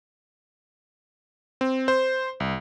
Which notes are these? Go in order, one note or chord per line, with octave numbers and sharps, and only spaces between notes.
C4
C5
C2